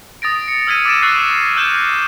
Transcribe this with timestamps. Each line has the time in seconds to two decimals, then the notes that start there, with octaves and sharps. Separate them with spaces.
0.22 D#6 A6 A#6 D7
0.48 C#7
0.67 E6 F6 G#6 B6 D#7
0.85 D6 E6 A6 D7 E7
1.02 C#6 E6 F#6 A6 C7
1.56 E6 F6 G6 G#6 E7